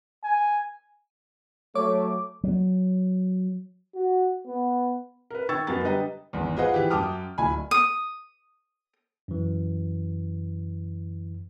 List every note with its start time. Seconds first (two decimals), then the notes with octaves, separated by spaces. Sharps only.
0.23 G#5
1.75 F#3 A3 C#5 D6
2.44 F#3
3.95 F#4
4.47 B3
5.30 A#4 B4
5.49 D#3 G5 C#6 E6 G#6 A6
5.67 F#2 B3 A#4 A6
5.83 D3 G3 B4 D#5 G5 A#5
6.33 G#1 E2
6.57 F4 G#4 B4 C5 D#5 F#5
6.74 E3 G4
6.90 F#2 G5 A5 D6 D#6 F6
7.38 D1 G#5 B5
7.71 D#6
9.28 F#2 E3